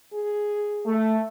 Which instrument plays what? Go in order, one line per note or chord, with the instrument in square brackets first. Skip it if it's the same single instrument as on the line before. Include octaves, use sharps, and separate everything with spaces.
[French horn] G#4
[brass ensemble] A3